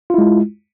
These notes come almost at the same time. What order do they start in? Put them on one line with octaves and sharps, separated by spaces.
F4 E4 G#3